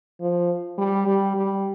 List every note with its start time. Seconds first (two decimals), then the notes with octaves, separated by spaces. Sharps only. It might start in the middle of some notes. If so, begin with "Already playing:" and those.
0.20 F3
0.78 G3
1.07 G3
1.36 G3